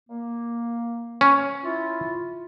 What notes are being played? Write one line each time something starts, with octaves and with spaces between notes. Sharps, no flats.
A#3
C#4
E4 F4